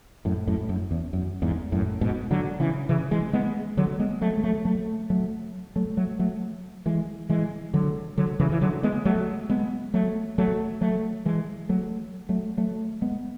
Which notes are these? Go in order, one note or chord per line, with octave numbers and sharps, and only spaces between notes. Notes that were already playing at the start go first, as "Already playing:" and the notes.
F#2 A2
F#2 A2
F#2
E2
F#2
E2 G#2
F#2 A2
G#2 B2
D3 F#3
C#3 E3
C#3 E3
E3 G#3
G#3 B3
D3 F#3
G#3 B3
F#3 A3
G#3
F#3 A3
F#3 A3
F#3 A3
F#3 A3
F#3 A3
F#3 A3
E3 G#3
E3 G#3
D3 F#3
D3 F#3
C#3 E3
E3
D3 F#3
G#3 B3
F#3 A3
G#3 B3
F#3 A3
F#3 A3
F#3 A3
E3 G#3
F#3 A3
F#3 A3
F#3 A3
G#3 B3